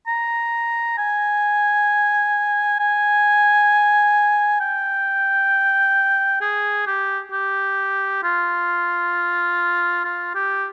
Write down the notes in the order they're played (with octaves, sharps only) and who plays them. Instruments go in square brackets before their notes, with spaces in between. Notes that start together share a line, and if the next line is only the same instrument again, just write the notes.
[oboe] A#5
G#5
G#5
G5
G#4
G4
G4
F4
F4
G4